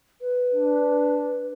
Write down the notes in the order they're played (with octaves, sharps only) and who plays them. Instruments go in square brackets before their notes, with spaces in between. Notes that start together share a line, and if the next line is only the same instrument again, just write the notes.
[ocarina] B4
[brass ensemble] D4